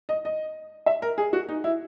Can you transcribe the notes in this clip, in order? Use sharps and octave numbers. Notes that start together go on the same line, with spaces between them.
D#5
D#5
E5
A#4
G#4
F#4
D#4
E4